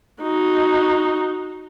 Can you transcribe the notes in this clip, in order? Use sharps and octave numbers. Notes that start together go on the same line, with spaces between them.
D#4 F#4